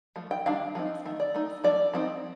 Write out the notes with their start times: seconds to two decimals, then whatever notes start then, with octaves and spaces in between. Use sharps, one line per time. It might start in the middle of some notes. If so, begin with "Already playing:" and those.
0.16 F3 A3
0.31 G5
0.46 D#3 G3 D4 F5
0.75 F3 C4 D#4
1.05 D#3 A3
1.20 D5
1.34 A3 D#4
1.64 F3 A3 D4 D5
1.93 F3 C4 D#4